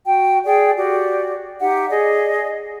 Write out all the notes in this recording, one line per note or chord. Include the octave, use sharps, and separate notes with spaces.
F#4 G5
G#4 D5 G5
F#4 G4 D5
D#4 G4 E5 F#5
G#4 D5 D#5